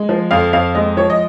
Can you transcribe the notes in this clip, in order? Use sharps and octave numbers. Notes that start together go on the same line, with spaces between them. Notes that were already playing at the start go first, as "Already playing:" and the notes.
Already playing: G#3
F3
F2 F5
F2 F5
G#3 D#5
F3 C#5
D#5